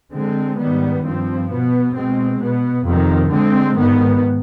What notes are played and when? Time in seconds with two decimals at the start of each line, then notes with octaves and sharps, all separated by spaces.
0.13 D3 G#3 C4
0.59 G#2 D#3 G3 B3
1.03 G2 F3 C4
1.50 B2 B3
1.94 B2 G#3 C4
2.39 B2 B3
2.85 F2 C3 D#3
3.30 D3 G#3 C4
3.75 G#2 D#3 B3